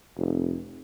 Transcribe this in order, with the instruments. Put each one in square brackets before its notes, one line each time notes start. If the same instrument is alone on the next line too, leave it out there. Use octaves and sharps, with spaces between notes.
[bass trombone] F1